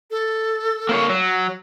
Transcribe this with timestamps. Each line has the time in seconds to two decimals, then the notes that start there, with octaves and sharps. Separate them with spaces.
0.11 A4
0.89 A#3 C5 C#5
1.10 F#3